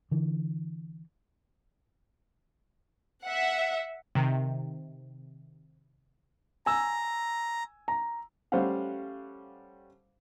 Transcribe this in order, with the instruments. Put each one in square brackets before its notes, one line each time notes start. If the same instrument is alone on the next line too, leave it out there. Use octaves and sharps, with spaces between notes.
[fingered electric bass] D3 E3
[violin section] E5 F#5
[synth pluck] C3 D#3
[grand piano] G#5 E6 [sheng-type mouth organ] A#5
[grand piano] A#5
[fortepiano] G3 A3 C#4 C5 F5 F#5